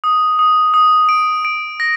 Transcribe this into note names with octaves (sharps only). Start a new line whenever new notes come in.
D#6
D#6
D#6
D7
D7
A#6